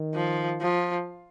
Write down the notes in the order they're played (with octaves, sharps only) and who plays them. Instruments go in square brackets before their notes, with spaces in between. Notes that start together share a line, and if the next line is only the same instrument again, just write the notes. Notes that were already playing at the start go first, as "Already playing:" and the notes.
Already playing: [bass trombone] D#3
[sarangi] F3
F3